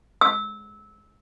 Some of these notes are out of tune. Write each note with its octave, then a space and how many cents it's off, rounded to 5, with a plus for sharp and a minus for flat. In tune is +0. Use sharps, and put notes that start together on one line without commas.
E6 -20